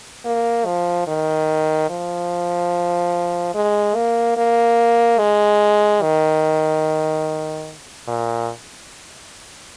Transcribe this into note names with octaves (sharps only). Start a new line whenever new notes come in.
A#3
F3
D#3
F3
G#3
A#3
A#3
G#3
D#3
A#2